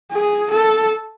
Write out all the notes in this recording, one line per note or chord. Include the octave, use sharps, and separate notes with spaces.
G#4
A4